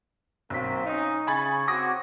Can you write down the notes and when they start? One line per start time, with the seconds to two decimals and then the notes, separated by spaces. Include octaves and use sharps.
0.50 B1 F#3 A#3 C4 B6
0.85 C#4 D#4
1.27 C#3 C#5 G#5 B5 A6
1.68 C4 F#4 D6 D#6 A#6